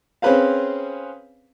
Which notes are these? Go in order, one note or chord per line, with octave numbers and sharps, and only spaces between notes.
C4 C#4 G#4 B4 C5 F5